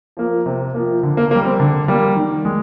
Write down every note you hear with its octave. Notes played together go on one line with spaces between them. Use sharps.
F3 A#3
C3
F3 A#3
D3
A#3
A#3
G3
C4
D3
G3 A#3
D#3
G#3